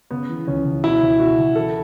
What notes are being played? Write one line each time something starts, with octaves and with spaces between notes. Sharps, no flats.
C#3 B3
E3
C#2 C#4
C#2
B2 E4
C#2
B2 F#4
C#2
E3 A4